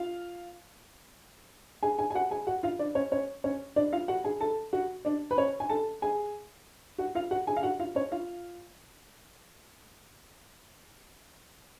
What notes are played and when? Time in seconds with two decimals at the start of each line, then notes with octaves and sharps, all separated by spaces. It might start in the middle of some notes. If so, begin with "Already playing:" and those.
Already playing: F4 F5
1.83 G#4 G#5
1.99 G#4 G#5
2.11 G#5
2.15 F#4 F#5
2.31 G#4 G#5
2.47 F#4 F#5
2.63 F4 F5
2.79 D4 D5
2.95 C#4 C#5
3.12 C#4 C#5
3.44 C#4 C#5
3.76 D4 D5
3.93 F4 F5
4.08 F#4 F#5
4.24 G#4 G#5
4.41 A4 A5
4.73 F#4 F#5
5.05 D4 D5
5.31 B4
5.37 C#4 C#5
5.60 G#5
5.69 A4 A5
6.02 G#4 G#5
6.98 F#4 F#5
7.15 F4 F5
7.31 F#4 F#5
7.47 G#4 G#5
7.57 F5
7.63 F#4 F#5
7.80 F4 F5
7.95 C#4 C#5
8.12 F4 F5